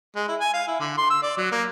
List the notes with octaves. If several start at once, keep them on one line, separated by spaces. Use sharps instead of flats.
G#3
E4
G#5
F5
E4
D3
C6
E6
D5
F#3
A#3